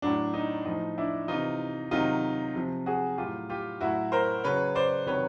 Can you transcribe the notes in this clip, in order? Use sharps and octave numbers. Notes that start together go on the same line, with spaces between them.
A2 F#3 D4
D#4
A2 F3 D#4
D4 E4
C3 E3 D#4 F4
C3 D#3 F#3 D#4 F4
C3 F3
F#4 G#4
A2 F#3 F4 G4
F4 G4
A2 F#3 E4 F#4
A#4 C5
C#3 F#3 B4 C#5
C5 D5
C3 D#3 F#3 B4 C#5